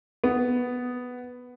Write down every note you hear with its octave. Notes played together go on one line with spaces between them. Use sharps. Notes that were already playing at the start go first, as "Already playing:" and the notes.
B3